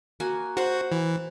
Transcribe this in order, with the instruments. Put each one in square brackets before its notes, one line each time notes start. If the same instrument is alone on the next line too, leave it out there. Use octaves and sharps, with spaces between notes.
[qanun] A#3 F#4 G#5
[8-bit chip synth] F#4 [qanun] C5 F#5
[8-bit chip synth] E3